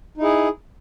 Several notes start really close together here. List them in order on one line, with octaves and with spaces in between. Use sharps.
D#4 E4 G#4